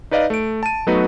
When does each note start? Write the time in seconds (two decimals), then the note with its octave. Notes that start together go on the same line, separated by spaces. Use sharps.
0.11 D#4 B4 D5 D#5 F5
0.30 A3 D7
0.63 A5 D#7
0.87 F#3 A3 B3 D#4 F#4 B4